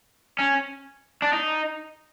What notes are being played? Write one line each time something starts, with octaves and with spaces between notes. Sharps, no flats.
C#4
D4
D#4